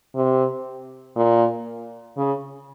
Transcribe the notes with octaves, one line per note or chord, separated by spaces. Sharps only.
C3
A#2
C#3